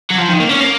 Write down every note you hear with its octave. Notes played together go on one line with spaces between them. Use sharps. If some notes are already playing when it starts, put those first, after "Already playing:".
F#3
F3
D#3
A#3
C#4
A#3